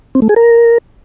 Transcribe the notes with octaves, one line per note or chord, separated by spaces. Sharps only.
C4
A3
G#4
A#4